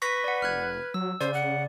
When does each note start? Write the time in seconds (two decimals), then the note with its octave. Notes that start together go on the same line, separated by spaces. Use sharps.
0.02 B4 C#6 A#6 B6
0.24 D5 F#5
0.42 F1 F6 F#6 G#6
0.94 F#3 E6
1.21 C#3 C5 D5
1.34 F#5